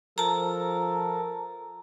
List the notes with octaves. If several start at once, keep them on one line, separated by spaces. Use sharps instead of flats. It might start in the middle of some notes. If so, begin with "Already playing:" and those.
F3 A4 A#4 A5 A#5